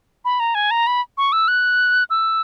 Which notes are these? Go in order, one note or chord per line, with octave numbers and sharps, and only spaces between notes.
B5
A#5
G#5
A#5
B5
C#6
E6
F#6
E6